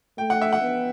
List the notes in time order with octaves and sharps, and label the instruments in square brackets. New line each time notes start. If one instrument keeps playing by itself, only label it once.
[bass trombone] A3 [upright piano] G5
[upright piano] F#5
E5
F#5
[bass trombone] B3